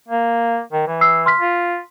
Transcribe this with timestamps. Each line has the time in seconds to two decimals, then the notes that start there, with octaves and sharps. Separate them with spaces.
0.08 A#3
0.72 D#3
0.88 E3
1.01 E6 C7
1.26 C6 F6 B6
1.40 F4